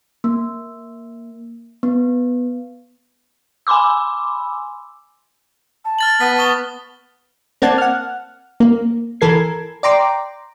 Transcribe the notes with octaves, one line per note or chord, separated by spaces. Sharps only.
A#3
B3
G#5 B5 C6 D6 E6
A5
F6 A6 F#7
B3 B6
C#6 D#6 G7
A#3 C4 D5 F#5 A5 G#6
F#5 F6
A#3
E3 A4 A#4 G#6 C7
D5 G5 A#5 C6 D6